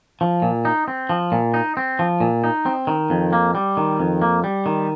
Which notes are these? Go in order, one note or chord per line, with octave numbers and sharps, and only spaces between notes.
F3
A#2
D#4
C4
F3
A#2
D#4
C4
F3
A#2
D#4
C4
D#3
F2
A#3
G3
D#3
F2
A#3
G3
D#3